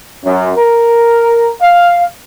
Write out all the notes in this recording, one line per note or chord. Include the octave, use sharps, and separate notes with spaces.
F#2
A#4
F5